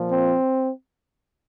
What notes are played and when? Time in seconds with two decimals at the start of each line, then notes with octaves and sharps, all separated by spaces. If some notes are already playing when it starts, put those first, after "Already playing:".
Already playing: A#2 F3
0.11 C4